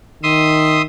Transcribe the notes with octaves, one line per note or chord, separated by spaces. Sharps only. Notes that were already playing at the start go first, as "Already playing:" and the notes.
D#3 E5 C6 D#6